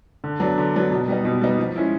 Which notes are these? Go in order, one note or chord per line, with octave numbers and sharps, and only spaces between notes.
D3
F#3 B3 D4
D3
F#3 B3 D4
B2
G3 B3 D#4
B2
G3 B3 D#4
F3
G#3 C#4 E4